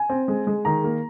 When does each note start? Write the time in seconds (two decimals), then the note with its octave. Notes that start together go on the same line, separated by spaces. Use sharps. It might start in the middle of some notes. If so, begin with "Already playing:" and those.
Already playing: G#5
0.10 C4
0.28 G#3
0.47 G#3
0.65 D#3 A#5
0.84 A#3